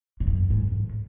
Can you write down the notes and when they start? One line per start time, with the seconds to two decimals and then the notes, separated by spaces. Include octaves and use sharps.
0.20 G#2
0.27 F#2
0.50 G#2
0.72 A2